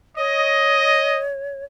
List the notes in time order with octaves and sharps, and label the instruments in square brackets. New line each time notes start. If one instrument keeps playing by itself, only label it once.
[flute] C#5 [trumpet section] D#5